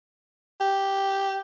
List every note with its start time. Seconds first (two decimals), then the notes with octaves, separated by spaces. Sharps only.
0.61 G4